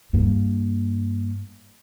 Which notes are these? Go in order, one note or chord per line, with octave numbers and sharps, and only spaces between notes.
G2 A#3